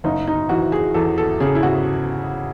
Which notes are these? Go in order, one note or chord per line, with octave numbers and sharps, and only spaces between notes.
F#1 D#4
D#4
E3 F#4
G#4
E2 A4
A4
C#3 G#4
E4
F#4